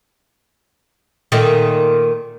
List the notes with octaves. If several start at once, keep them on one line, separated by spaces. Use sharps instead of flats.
A#2 D#3 A3